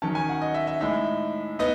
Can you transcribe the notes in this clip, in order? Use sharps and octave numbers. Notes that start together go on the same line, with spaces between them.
D#3 F#3 C#4 A5
G#5
F#5
D#5
E5
E5
A2 G#3 D#4 E5
B3 D#4 D#5